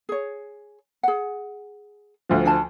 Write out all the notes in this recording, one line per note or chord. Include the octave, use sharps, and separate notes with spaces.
G#4 C#5
G#4 F#5
D2 F3
D4 G#5 A5